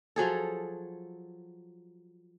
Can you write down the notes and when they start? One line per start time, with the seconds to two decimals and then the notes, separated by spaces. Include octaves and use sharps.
0.16 F3 F#3 G#4 A4